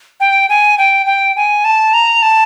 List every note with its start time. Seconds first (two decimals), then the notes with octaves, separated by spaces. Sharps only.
0.20 G5
0.49 G#5
0.78 G5
1.06 G5
1.36 G#5
1.65 A5
1.93 A#5
2.22 A5